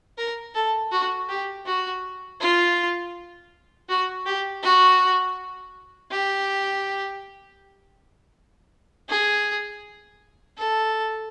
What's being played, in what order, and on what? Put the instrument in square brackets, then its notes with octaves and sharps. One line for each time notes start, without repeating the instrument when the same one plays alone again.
[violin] A#4
A4
F#4
G4
F#4
F4
F#4
G4
F#4
G4
G#4
A4